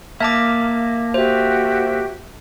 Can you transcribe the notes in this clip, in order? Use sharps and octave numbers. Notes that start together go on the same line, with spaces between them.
A#3 E5 A5 D6
F#4 G4 C5 E5